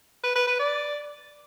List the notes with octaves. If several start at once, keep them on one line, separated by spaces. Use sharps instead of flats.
B4
B4
B4
D5